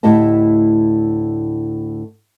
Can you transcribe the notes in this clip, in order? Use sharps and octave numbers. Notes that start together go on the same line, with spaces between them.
D2 A2 E4 G4 D#5 A5